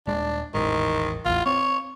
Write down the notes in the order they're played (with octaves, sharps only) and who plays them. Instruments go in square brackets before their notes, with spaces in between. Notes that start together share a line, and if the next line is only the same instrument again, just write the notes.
[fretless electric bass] D#1 G#3 [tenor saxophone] D4
[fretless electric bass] E1 A1 G#2 [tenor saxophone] D#3
[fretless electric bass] A1 E2 [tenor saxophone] F4
[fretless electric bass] C4 [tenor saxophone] C#5